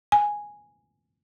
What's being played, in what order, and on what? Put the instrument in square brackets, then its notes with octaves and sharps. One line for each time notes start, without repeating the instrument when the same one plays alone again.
[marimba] G#5